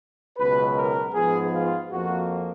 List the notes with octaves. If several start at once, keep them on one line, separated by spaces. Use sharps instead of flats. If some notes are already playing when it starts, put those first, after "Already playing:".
C#2 B2 F#3 B4
A#4
G#2 F3 B3 G#4
F4
F2 F3 A#3 F#4